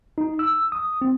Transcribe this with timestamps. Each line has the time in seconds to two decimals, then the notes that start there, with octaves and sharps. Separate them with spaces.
0.18 D#4
0.39 E6
0.72 D#6
1.02 C4